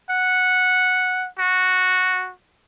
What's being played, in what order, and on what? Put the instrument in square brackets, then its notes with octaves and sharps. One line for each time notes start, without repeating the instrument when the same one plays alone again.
[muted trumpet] F#5
F#4